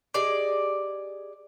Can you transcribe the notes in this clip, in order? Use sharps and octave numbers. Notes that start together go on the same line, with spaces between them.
G4 G#4 D5 D#5